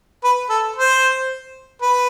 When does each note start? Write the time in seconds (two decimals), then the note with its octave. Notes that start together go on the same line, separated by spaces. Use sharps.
0.24 B4
0.50 A4
0.76 C5
1.82 B4